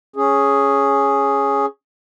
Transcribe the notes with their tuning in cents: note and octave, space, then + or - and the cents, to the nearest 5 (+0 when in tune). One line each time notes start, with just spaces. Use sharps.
C#4 +0 G#4 +0